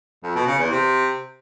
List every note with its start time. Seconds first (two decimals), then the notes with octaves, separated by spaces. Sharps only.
0.24 F2
0.35 B2
0.47 C#3
0.59 E2
0.71 C3